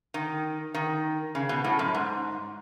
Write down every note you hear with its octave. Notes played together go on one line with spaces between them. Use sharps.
D#3
D#3
C#3
B2
A2
F#2
G#2